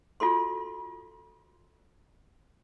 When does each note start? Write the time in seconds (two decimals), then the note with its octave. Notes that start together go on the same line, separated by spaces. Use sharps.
0.20 F4 F#4 A4 C6